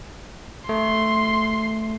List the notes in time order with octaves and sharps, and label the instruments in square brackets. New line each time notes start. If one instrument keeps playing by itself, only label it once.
[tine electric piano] A3 [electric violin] C6